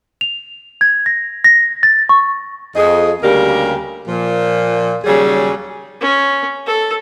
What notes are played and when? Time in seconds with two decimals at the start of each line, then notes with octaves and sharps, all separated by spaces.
0.21 F7
0.81 G#6
1.06 A#6
1.44 A#6
1.83 A6
2.09 C#6
2.76 F2 G#4 D#5
3.22 D2 C#3 G3 A#3 G4 A#4
4.07 A#2 F3
5.04 D#2 C#3 F#3 G3 G#4
6.01 C#4
6.67 A4